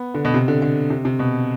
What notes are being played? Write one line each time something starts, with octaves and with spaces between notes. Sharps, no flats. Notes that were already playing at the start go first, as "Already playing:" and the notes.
Already playing: B3
D3
B2
C3
D3
D3
C3
C3
B2